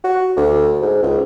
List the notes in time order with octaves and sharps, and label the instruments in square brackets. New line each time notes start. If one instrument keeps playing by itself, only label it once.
[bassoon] F#4
D2
G#2
C#2